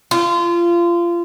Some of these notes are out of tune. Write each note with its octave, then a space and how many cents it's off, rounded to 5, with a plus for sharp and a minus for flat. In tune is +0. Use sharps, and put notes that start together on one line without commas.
F4 -25